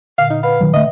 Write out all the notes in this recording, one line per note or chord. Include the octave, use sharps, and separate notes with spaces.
A#2 D3 F5
D#4
B4 F5 F#5 B5
D#3 F#3
D3 A3 D#5 E5 F#5